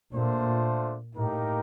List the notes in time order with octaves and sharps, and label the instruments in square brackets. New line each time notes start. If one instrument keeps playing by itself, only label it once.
[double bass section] A#2 [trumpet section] A3 D4 F4 A4 C5
[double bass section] A2 [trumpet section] A#3 D#4 G4 A#4